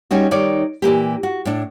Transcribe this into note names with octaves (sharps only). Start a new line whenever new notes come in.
G3 C#4 D#4 F#4
D#3 G3 D#4 C#5 D5
A#2 E3 A#3 G4
F#4
A2 D4